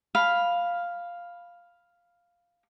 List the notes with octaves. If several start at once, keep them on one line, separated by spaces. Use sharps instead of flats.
F5 B5